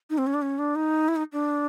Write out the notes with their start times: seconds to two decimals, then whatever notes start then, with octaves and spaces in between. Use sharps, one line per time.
0.10 D#4
0.18 C4
0.27 C#4
0.34 D4
0.42 C#4
0.59 D4
0.76 D#4
1.08 E4
1.16 D#4
1.33 D4